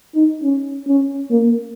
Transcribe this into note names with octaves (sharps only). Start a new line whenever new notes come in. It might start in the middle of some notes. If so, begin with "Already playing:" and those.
D#4
C#4
C#4
A#3